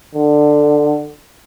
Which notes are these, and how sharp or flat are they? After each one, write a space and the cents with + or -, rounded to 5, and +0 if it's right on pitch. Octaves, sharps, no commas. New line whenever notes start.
D3 +15